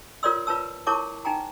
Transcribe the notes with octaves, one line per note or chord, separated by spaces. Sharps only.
F4 A#4 C#5 D5 C6 E6
F4 B4 C#5 A5 E6
E4 A#4 C#5 A5 C#6 D6
D#4 G5 G#5 A#5